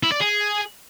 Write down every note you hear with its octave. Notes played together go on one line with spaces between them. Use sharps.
E4
D5
G#4